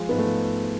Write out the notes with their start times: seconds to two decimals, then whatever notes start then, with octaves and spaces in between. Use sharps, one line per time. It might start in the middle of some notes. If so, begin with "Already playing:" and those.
Already playing: F3 G#3
0.09 G#2 B3
0.18 A3
0.25 F3